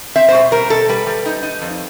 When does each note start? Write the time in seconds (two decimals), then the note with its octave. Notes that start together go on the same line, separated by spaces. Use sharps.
0.16 C4 E5
0.28 C5
0.35 B2
0.52 G3 A#4
0.70 B2 A4
0.89 G3 B4
1.06 G3
1.26 D#4
1.43 D#4
1.62 F2